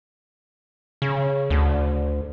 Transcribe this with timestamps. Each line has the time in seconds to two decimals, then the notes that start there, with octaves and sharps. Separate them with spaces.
1.02 C#3
1.50 D2